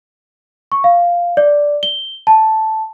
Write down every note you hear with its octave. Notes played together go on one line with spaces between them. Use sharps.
C#6
F5
D5
G7
A5